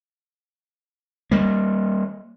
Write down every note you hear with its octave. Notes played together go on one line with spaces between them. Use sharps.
G3 A#3